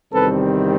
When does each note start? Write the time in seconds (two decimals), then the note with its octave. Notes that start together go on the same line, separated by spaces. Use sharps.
0.14 E2 C3 D#3 G3 C4 A4 B4